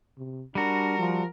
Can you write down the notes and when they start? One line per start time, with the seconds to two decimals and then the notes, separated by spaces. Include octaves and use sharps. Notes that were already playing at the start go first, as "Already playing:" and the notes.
0.18 C3
0.55 G3 D4 F#4 A#4
0.98 F3